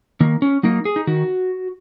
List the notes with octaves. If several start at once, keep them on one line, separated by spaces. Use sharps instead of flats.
D#3 A#3
C#4
F#3 A#3 D#4
G#4
D#4
D#3 F#4